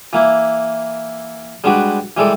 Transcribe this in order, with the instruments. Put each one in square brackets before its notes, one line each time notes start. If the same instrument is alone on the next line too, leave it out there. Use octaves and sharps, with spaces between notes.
[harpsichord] E3 A#3 E4
G3 G#3 D4 F#4 B4 D5
E3 G3 G#3 A4 D5